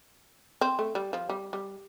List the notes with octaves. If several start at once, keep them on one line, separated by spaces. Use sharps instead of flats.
C4
A3
G3
F3
G3
G3